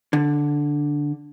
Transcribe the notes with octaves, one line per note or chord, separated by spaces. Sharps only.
D3